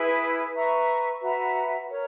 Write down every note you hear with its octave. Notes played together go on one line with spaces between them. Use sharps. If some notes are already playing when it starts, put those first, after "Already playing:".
Already playing: E4 G#4 B4
B4 E5 A#5 C#6
F#4 B4 E5 A#5
A#4 C#5